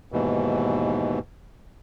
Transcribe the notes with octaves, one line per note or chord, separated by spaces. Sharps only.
D#2 G#2 B2 E3